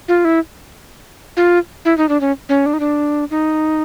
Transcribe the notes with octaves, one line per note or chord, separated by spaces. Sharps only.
F4
E4
F4
E4
D#4
D4
C#4
C#4
D4
D#4
D4
D#4